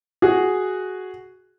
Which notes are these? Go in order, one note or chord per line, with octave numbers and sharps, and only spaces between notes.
F#4 G#4